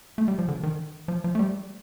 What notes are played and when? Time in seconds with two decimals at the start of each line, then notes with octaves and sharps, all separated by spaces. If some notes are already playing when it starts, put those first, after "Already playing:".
0.18 A3
0.28 G3
0.39 F3
0.48 D3
0.63 D#3
1.08 F3
1.24 F3
1.35 A3
1.39 G3